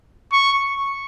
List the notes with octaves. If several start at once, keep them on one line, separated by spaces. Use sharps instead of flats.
C#6